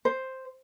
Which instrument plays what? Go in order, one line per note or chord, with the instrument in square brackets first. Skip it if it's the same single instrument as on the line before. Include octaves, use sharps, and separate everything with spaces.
[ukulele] C5